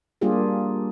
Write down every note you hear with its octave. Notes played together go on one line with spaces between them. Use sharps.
G3 A#3 D4 F4 G4 G#4